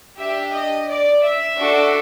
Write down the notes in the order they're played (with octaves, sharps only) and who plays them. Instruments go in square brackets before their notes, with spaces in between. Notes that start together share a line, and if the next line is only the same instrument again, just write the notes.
[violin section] D4 G4 E5
D#5
D5
E5
D4 F#4 A4